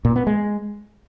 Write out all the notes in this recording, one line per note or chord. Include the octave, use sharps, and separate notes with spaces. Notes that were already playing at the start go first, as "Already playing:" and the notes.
A#2
B3
G#3